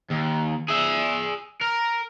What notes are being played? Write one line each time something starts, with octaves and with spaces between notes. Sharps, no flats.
D#2
G#4 E5
A#4